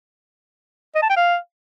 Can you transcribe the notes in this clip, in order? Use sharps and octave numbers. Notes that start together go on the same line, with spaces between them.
D#5
A5
G5
F5